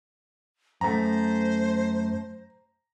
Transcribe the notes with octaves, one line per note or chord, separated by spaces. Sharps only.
F#2 A3 C5 A#5